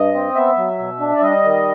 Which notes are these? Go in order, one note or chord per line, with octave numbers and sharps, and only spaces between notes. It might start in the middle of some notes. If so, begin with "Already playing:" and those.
Already playing: G2 D#5
C4
B3 E5
F#3
B2
D4
D5
G3 D#5
D#3